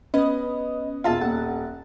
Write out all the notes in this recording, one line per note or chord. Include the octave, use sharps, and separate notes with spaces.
B3 C#4 B4 D#5
E1 F4 E5 A5 A6
D#1 F#5